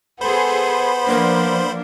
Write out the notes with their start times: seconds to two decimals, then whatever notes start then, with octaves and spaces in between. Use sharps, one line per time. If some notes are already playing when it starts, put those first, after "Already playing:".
0.21 B3 G#4 A4 C5 B5 C6
1.07 F3 A#3 D4